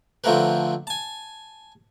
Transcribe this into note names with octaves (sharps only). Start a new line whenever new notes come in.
D3 F3 A3 C4 A#4 B4
G#5 A5